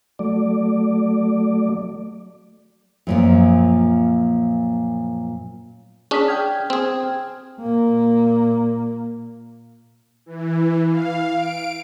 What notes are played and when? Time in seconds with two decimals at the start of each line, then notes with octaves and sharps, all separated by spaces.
0.19 F#3 A3 D5
3.07 F#2 A#2 F3
6.11 C#4 D4 G#4 D#6 B6
6.28 G5 F6 G#6
6.70 C4 G#4
7.61 A#2 A#3
10.26 E3
10.89 F5
11.35 D7